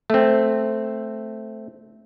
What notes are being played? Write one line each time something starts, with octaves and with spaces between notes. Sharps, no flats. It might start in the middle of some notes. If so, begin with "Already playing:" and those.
A3 C4